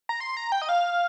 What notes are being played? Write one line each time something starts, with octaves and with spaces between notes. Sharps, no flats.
A#5
C6
A#5
G5
D#5
F5